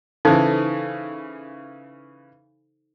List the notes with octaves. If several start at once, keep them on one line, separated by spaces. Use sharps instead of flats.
C#3 E3 D#4 A4 C5